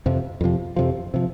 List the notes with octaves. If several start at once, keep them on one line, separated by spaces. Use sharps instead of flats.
F2 C3 F3
F2 C3 F3
F2 C3 F3
C3 F3